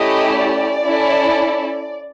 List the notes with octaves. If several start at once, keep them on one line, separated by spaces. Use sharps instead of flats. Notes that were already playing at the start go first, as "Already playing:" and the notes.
Already playing: A3 C#4 E4 G4 D#5
D5
C#4 E4 A4